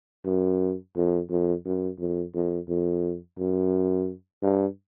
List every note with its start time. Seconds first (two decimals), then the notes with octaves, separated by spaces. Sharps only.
0.25 F#2
0.96 F2
1.30 F2
1.65 F#2
2.00 F2
2.35 F2
2.68 F2
3.39 F#2
4.42 G2